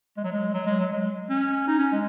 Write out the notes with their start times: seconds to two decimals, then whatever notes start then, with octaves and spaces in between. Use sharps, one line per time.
0.17 G#3
0.24 F#3
0.32 G#3
0.54 F#3
0.66 G#3
0.79 F#3
0.92 G#3
1.30 C#4
1.67 D#4
1.79 C#4
1.92 G#3